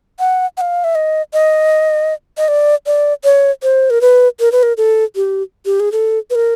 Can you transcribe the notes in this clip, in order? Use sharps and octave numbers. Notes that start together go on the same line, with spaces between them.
F#5
F#5
F5
E5
D#5
D#5
D#5
D5
D5
C#5
C5
A#4
B4
A#4
B4
A#4
A4
G4
G4
G#4
A4
B4
A#4